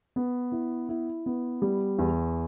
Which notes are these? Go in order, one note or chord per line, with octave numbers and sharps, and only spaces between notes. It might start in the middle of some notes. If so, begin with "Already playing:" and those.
B3
E4
E4
B3
G3
E2